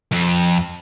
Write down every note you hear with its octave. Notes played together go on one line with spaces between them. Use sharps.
F2